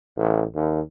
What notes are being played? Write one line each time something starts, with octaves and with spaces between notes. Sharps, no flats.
A1
D#2